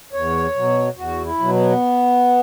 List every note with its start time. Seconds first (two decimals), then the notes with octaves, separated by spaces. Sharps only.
0.13 E2 C#5
0.56 B2 F#3
0.97 E2 F#4
1.25 E4
1.40 B2 F#3
1.53 B3